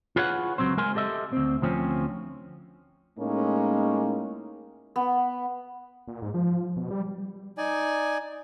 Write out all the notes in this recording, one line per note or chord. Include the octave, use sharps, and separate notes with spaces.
F4 G#4 B4 C#5 D5 F#5
C#2 F#3 C4 C5
G#3 A#4 G#5 C6
G4 A4 D#5 E5
D2 C4
D2 F3 C4 C#4
A2 G#3 A#3 C#4 D#4
B3
A#2
G#2
F3
B2
G3
D#4 D5 G#5